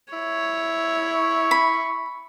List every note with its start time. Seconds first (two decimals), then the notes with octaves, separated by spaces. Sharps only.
0.13 E4 C#5
1.14 C#6
1.51 B5